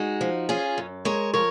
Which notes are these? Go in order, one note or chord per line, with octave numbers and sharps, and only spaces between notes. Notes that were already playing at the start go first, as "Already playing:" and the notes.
Already playing: G#3 D#4 F#4
F3
C#4 F4 G#4
F#2
G#3 A#4 C#5
F3 A#4 C#5